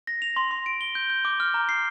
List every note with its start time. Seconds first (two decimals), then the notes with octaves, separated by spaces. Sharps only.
0.07 A#6
0.22 F7
0.36 C6
0.51 C6
0.66 D7
0.81 G7
0.95 G6
1.10 G6
1.25 D6
1.40 F6
1.54 A#5
1.69 C7